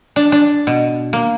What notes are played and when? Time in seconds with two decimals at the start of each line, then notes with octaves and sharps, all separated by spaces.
0.16 D4
0.32 D4
0.67 B2
1.13 A#3